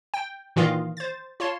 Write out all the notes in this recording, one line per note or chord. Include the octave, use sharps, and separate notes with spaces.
G5
A#2 D#3 E3 F4 D#5 F5
C5 A6
F4 C#5 A5 C6